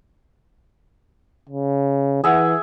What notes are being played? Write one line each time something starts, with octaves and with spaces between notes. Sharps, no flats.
C#3
E3 G#4 E5 F#5